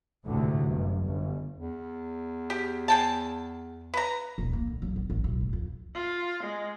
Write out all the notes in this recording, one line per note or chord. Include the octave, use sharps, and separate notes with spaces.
G#1 D2 A2 C3
G1 F#2
G1
E2
G4
G#4 G5 A5
B4 A#5
D#1
A#3
D3
B1
B3
A1
B1
F1
F2
F4
G#3